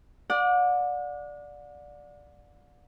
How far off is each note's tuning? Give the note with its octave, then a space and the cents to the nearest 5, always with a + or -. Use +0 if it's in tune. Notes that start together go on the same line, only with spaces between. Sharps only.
D5 +0 F#5 -40